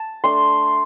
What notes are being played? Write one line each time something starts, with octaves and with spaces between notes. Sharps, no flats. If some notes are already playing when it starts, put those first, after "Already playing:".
Already playing: A5
A3 D4 C6